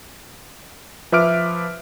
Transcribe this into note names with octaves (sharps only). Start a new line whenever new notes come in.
F3 B4 E5 D6 F6 D7